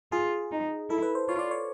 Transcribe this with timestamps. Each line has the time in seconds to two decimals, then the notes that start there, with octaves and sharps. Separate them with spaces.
0.12 F4 G#4
0.51 D#4
0.90 E4 A4
1.02 B4
1.15 C5
1.29 F4 C#5
1.39 D5
1.51 C#5